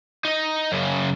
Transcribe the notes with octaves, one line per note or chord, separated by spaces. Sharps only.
D#4 D#5
F#2 C#3